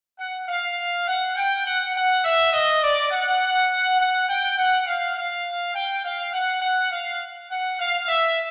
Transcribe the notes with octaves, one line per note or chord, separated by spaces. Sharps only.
F#5
F5
F#5
G5
F#5
F#5
E5
D#5
D5
F#5
F#5
G5
F#5
F5
F5
G5
F5
F#5
F#5
F5
F#5
F5
E5